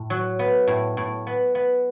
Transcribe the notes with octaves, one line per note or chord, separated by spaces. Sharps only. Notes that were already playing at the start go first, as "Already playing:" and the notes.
Already playing: A2
F#3
B3
A2
A2
B3
B3